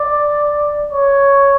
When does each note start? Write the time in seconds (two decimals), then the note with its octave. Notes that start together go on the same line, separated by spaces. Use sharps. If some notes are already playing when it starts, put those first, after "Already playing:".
Already playing: D5
0.93 C#5